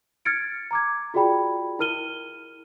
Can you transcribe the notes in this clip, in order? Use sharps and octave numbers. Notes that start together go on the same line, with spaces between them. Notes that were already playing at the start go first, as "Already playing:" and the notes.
F6 G#6 A6 C#7 D7
A#5 D6 G#6
F4 F#4 G#4 D5 G5 B5
E4 A#4 F6 D#7 G7